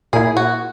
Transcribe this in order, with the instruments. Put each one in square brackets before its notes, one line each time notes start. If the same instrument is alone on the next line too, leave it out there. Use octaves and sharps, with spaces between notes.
[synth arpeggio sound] A#2 A#3 E4 [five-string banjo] G#4
[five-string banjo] F#4